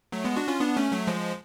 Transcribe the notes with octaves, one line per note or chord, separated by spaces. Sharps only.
F#3 A3
G#3 B3
D4 F#4
C#4 F4
B3 D4
A3 C#4
F#3 A3
F3 G#3